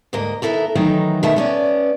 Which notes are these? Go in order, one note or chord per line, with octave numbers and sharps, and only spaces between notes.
D2 G#2 A#3 D#5
D#2 B3 E4 A4 A#4
D#3 E3 F#3 A3 D#4
B2 D#3 A3 A#4 E5 A5
B3 C#4 D5